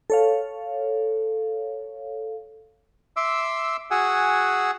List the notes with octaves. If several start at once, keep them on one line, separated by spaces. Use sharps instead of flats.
A4 C#5 F5
E5 C6 D6 E6
F#4 G#4 F#5 G#5 E6